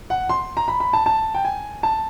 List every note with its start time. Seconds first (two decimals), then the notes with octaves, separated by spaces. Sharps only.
0.10 F#5
0.29 C6
0.57 A#5
0.68 B5
0.80 B5
0.93 A5
1.06 A5
1.35 G5
1.45 G#5
1.83 A5